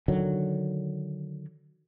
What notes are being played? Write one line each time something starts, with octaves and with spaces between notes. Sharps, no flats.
D3 D#3 F#3